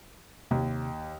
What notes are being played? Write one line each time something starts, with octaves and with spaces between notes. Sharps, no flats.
D#2 C3